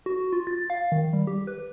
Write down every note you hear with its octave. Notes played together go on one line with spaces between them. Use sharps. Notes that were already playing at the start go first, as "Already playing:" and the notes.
F#4
F4
A6
F5
D#3
G3
G4
B4